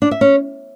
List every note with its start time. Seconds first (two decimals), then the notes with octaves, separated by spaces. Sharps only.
0.02 D4
0.11 E5
0.21 C#4